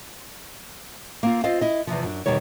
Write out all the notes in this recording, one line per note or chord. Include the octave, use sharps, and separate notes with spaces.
A#3 C4 F4
C4 F4 C5 D#5 F5
E4 D#5
E2 C3 E3 F3
F#2 D4
E2 B2 D#3 G3 C#5